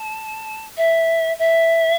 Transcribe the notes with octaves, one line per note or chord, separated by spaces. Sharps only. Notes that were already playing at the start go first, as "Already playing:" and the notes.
Already playing: A5
E5
E5